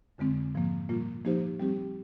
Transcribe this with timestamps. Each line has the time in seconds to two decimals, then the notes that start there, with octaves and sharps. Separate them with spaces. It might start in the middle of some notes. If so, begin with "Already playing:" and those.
0.18 F2 D3 G#3 C4
0.55 G#2 F3 A#3
0.89 A#2 G3 A#3 F4
1.25 F3 A#3 D#4 G4 C5
1.60 G3 C4 G4